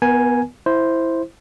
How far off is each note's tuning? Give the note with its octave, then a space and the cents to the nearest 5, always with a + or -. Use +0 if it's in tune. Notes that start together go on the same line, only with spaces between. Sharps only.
B3 +0 A#4 +40 G#5 +0
E4 +0 C5 +0